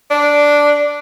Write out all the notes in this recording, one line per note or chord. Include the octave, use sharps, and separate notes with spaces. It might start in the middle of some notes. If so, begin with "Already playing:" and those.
D4